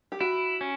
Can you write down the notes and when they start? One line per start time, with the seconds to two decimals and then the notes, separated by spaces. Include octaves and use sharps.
0.12 G4
0.20 E4 F#4
0.61 C#4